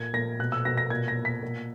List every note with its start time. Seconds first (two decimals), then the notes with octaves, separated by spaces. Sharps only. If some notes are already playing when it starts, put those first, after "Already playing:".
Already playing: A#2 G#6
0.13 A#2 A#6
0.39 B2 F#6
0.52 E6
0.65 B2 A#6
0.77 A#6
0.90 A#2 G#6
1.08 A#6
1.17 A#2
1.25 B6
1.42 A#2